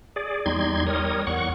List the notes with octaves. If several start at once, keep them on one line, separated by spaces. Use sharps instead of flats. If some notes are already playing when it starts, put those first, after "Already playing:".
G#4 D5
E2 G3 D#4 C6 G#6
G3 A#4 C#5 D#6
E2 F#5 C#6